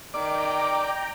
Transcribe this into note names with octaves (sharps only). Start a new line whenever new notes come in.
D#3 D5 G5 A#5 D6